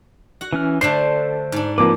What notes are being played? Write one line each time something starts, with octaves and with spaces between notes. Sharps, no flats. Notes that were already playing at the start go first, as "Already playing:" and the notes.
F#4 F#5
E3 C#4 F6
D3 A3 D4 C5 A5 C6 C7
G#2 D4
F3 A#3 C4 B4 D6